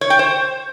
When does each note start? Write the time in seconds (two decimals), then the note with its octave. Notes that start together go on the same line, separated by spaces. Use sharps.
0.01 C#5
0.10 G5
0.19 C5